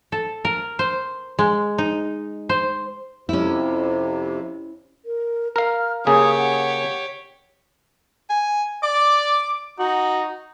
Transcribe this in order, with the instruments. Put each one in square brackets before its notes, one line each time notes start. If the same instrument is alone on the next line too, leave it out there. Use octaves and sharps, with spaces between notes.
[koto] A4
A#4
C5
G#3
D#4
C5
[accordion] F2 C3 [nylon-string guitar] C#4 E4
[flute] A#4
[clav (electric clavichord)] A#4 F5 [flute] F6
[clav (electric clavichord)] C#3 A#3 G#4 [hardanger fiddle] G4 C#5 [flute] D#6
[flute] F#5
[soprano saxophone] G#5
[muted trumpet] D5 [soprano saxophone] D6
[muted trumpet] D#4 [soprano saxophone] F#4